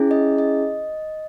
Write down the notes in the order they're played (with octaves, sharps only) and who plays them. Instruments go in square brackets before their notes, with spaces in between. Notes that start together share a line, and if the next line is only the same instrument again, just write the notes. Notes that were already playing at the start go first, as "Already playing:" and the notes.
Already playing: [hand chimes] C#4 E4 G#4
D#5
D#5